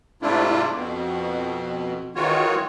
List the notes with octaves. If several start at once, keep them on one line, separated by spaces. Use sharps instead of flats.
G#2 C3 A3 D4 E4 F4
F2 B2
D#3 E3 G#3 F4 F#4 C#5